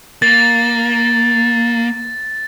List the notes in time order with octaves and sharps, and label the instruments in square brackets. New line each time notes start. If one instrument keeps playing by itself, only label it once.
[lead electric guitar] A#3 [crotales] A6